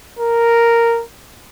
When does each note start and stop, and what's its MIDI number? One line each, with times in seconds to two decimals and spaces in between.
0.19 1.03 70